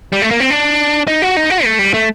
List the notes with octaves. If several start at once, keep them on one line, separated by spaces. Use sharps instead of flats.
G3
A3
A#3
C4
D4
D#4
F#4
D#4
F#4
A3
G3
A3